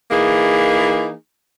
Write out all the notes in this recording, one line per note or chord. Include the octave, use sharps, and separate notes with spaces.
E3 A#3 D#4 G#4